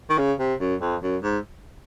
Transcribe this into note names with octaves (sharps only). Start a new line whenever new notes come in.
D#3
C#3
C3
F#2
F2
F#2
G#2